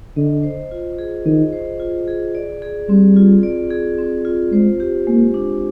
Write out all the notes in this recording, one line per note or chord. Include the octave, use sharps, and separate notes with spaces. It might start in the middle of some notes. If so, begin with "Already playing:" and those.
D3 D#5
C5
F4
G#4
D#3 D#5
C5
F4
G#4
D5
G#4
G3 C4
F4
D5
G#4
C4
F4
G#3 C5
G4
G#3 A#3
D4